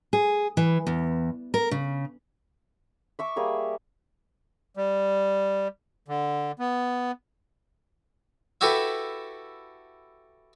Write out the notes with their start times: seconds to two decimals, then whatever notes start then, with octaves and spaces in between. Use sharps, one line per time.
0.13 G#4
0.57 E3
0.87 E2
1.54 A#4
1.71 C#3
3.19 E5 C#6 D6
3.36 G3 A#3 G#4 A#4
4.77 G3
6.08 D3
6.59 B3
8.61 E4 F#4 G4 A4 B4